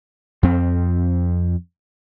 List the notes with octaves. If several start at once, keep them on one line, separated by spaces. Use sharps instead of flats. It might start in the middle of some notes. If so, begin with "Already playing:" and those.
F2 C4